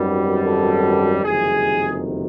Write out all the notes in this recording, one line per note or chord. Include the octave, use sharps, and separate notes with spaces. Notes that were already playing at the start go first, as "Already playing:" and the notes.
Already playing: G#1 F#2 D#3 G3 B3
A4
F#1 F2 C3 D#3 G3 G#4